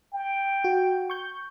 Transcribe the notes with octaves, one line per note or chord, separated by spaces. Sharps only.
G5
F#4
C#6 G6